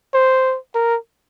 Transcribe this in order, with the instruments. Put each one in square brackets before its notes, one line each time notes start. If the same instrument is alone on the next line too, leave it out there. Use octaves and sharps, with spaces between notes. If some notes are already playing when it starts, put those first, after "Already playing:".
[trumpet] C5
A#4